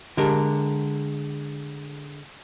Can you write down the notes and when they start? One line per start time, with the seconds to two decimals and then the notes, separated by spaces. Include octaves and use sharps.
0.17 D3 G#3 G4 A#4